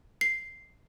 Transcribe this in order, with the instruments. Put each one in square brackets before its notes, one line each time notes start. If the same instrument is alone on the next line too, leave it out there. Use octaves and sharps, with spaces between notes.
[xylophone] C7